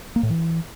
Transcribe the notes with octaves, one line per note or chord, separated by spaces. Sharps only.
A#3
A2
E3